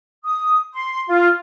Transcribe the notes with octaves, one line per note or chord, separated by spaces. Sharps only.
D#6
C6
F4